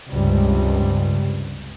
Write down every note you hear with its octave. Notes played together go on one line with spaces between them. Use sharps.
C#2 G2 C3 G3